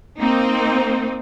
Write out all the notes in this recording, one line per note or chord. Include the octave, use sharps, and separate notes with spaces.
A#3 C4 D#4